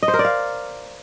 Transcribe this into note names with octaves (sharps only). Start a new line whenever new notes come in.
D#5
C5
A#4
D5
F5